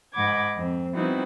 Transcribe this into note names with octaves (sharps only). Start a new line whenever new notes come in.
G#2 D#5 F#5 B5 D6 G#6
F2 C4
G3 B3 C4 D#4 E4 F#4